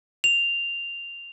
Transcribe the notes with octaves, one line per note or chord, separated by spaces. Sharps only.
F7